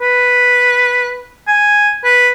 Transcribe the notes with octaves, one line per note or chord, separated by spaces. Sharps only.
B4
G#5
B4